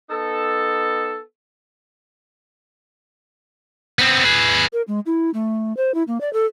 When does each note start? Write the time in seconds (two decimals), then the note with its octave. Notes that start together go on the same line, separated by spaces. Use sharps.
0.10 B3 D#4 A4
3.99 B3 C4
4.24 G#4 B4
4.73 A#4
4.88 G#3
5.06 E4
5.34 A3
5.77 C5
5.94 E4
6.08 A#3
6.21 D5
6.33 A4